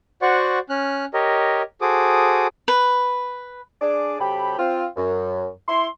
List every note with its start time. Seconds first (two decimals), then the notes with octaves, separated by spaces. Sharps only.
0.22 F#4 C5 D5 F#5 C#6
0.70 C#4 F6 F#6
1.14 G4 A#4 C#5 D#5
1.81 F#4 G#4 A4 C5 D6 D#6
2.68 B4
3.82 D4 G#4 D5
4.20 C3 F#3 G4 A4 G5 B5
4.59 C4 F4
4.97 F#2
5.68 E4 C6